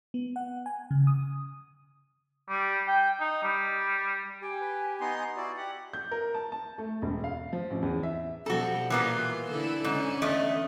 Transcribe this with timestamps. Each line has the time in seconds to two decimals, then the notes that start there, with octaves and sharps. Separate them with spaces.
0.14 B3
0.36 F#5
0.66 G#5
0.91 C#3
1.07 D#6
2.49 G3
2.88 G5
3.20 D#4
3.44 G3
4.42 G4 G5 G#5
4.61 B4
5.01 B3 D#4 C6
5.37 E4 F#4 D5
5.57 G4 F#5
5.93 G6
6.11 A#4
6.34 A5
6.52 A5
6.78 A3
7.02 E1
7.24 F5
7.53 F3
7.70 A1
7.82 E2
8.03 E5
8.46 B2 F3 G3 F#4 A4
8.90 A#2 E3 A#3 B3 F4
9.50 D3 E4 A4
9.84 G#2 D3 C#4
10.22 E2 A3 D#5